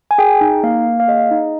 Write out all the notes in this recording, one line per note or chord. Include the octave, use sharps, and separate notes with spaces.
G#5
G#4 G5
D#4
A#3 F5
A#3
F5
G#4 D#5
D#4